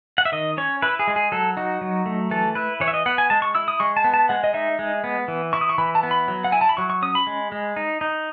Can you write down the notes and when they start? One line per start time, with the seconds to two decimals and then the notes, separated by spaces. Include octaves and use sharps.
0.18 F#5
0.25 E5
0.32 D#3 D#5
0.57 C#4 C#5
0.82 E4 B4
0.99 G#4
1.08 G#3
1.16 G#4
1.32 F#3 A4
1.57 D#4 F#4
1.81 F#3
2.06 A3
2.31 E3 A4
2.55 E4 B4
2.80 E3 C#5
2.88 E5
2.94 D#5
3.06 B3 F#5
3.18 G#5
3.30 G#3 A5
3.42 C#6
3.55 E4 E6
3.68 D#6
3.80 G#3 C#6
3.97 A5
4.04 B3
4.14 A5
4.29 G#3 F#5
4.44 D#5
4.54 D#4 E5
4.79 G#3
5.04 B3
5.28 E3
5.53 E4 C#6
5.61 D#6
5.69 C#6
5.78 E3 B5
5.95 A5
6.03 B3
6.11 B5
6.28 F#3
6.44 F#5
6.52 E4 G#5
6.61 A5
6.69 B5
6.77 F#3 C#6
6.90 C#6
7.02 C#4 D#6
7.15 B5
7.27 G#3
7.52 G#3
7.76 D#4
8.01 D#4